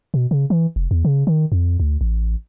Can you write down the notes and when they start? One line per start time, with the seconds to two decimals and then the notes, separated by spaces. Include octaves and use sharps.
0.14 B2
0.31 C#3
0.50 E3
0.76 F1
0.91 E2
1.05 C#3
1.27 D#3
1.52 F2
1.80 D2
2.01 A1